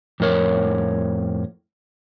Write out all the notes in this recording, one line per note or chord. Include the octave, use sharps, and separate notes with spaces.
F2 A2 A#4 C#5